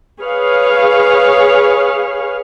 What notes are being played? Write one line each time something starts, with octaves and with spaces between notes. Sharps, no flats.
G#4 B4 C#5 F5